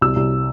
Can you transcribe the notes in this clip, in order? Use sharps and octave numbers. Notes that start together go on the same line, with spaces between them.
C2 E6
C2